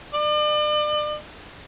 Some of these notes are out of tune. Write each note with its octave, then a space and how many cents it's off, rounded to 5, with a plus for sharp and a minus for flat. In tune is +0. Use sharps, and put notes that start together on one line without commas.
D5 +40